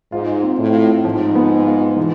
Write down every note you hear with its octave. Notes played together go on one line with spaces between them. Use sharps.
G#2 F4
C4
A2
F4
G#2 F3
B3
F4
E3